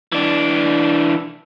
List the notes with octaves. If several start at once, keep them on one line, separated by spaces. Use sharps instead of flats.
E3 D4